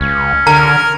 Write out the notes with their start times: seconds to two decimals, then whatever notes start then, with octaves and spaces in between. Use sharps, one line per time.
0.01 C#2 C#4
0.47 D3 A#4 A#5